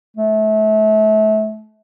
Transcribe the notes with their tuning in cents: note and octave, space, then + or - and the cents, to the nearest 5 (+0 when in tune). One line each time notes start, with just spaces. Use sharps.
A3 -30